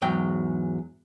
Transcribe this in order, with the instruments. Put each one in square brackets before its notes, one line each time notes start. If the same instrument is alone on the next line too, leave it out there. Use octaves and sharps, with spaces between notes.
[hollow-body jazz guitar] E2 G#2 F#3 G5